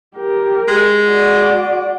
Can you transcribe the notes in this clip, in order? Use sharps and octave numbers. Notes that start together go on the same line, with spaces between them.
G4 A#4
G#3
F#4 D5